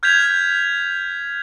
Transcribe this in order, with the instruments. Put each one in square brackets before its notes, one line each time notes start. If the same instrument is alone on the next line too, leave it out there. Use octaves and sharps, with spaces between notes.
[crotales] F6 G6 G#6 B6 F7